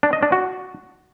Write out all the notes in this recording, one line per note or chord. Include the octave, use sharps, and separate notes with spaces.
D4
D#5
D4
F#4